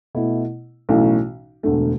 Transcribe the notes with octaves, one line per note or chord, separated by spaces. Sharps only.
B2 A3 E4
B1 A2 E3 A3 C#4
E1 D2 D3 A3